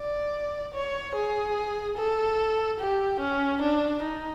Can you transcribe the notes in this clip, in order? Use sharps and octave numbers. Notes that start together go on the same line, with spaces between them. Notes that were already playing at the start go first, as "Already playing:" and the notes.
Already playing: D5
C#5
G#4
A4
G4
C#4
D4
D#4